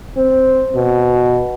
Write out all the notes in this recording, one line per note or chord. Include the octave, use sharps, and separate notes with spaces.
C4
B2